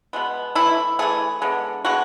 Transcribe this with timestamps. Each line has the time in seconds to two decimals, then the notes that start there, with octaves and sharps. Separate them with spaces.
0.13 B2 G#3 B3
0.55 E3 A3 E4
0.99 E3 A3 G#4
1.42 D3 G#3 B3
1.85 D3 G#3 B3 F#4